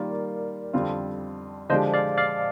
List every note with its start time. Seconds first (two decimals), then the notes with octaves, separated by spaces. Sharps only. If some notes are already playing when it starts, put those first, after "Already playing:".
Already playing: D#3 G3 A#3 F4 A#4 D5
0.73 F2 D3 G3 C4 F4
1.69 D3 F3 G#3 D4 G4 C5 D#5
1.94 D5 F5
2.18 D5 F5